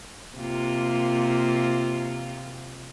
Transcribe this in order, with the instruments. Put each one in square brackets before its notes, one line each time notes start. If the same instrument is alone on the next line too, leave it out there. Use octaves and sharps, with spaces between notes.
[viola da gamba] C3 A#3 F4